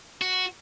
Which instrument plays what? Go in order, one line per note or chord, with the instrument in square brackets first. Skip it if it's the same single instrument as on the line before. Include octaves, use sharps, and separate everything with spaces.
[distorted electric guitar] F#4